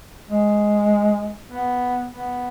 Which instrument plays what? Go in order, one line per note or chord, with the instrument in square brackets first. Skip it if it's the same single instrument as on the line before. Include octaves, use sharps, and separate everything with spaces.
[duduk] G#3
B3
B3